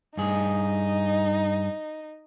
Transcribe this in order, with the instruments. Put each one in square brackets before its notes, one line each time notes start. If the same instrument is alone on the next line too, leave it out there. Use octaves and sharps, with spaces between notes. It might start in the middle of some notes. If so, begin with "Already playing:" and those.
[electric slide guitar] G2 G#4 [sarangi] D#4